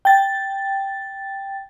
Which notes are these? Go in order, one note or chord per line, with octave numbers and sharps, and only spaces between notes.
G5 A6